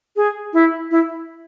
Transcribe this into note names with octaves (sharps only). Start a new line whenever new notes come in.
G#4
E4
E4